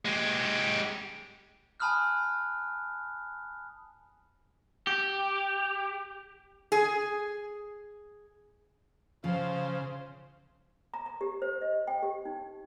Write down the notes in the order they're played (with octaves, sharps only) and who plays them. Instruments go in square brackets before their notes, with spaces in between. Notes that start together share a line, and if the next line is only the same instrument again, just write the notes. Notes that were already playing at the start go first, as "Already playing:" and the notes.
[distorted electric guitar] G#3 G4
[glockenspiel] G#5 A5 B5 D#6 F6 F#6
[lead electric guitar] G4
[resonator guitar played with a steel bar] G#4
[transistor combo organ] C#3 [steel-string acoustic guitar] F3 [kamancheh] C5 F5
[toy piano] A#5
A#5
G4
C5
D#5
G5
G4
D#4